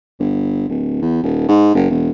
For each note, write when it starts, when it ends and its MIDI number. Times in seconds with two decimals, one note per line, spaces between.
0.19 0.68 31
0.69 0.98 26
1.01 1.21 40
1.23 1.44 27
1.48 1.72 44
1.74 1.85 30
1.90 2.10 28